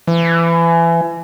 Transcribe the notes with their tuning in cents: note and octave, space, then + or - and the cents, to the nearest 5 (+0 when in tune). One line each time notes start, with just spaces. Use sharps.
E3 +30